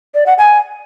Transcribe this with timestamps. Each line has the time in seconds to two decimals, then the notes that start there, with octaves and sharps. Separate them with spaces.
0.14 D5
0.26 F#5
0.38 G#5